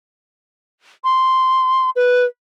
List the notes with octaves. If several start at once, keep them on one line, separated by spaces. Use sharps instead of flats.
C6
B4